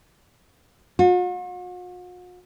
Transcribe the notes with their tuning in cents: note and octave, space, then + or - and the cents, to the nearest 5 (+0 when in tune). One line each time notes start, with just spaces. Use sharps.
F#4 -45